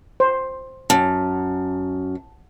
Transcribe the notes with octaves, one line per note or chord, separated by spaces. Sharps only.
C5
F#2 A5